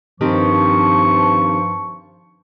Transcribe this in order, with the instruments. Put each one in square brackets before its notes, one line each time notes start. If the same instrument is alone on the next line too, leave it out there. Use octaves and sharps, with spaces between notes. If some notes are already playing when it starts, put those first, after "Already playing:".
[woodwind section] G2 F3 [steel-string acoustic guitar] D#3 C4 G4 [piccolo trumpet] C#6